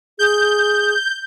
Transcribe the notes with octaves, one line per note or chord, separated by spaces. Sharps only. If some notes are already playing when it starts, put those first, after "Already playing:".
G#4 G6